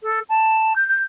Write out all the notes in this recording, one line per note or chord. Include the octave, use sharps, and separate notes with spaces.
A4
A5
G6
G6